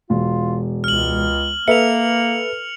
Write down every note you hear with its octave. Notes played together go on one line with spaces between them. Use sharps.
E1 F4
C#2 F6 F#7
A#3 A4 B4 E5 C#7 F7